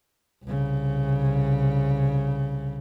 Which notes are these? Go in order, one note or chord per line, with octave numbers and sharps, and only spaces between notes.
C2 C#3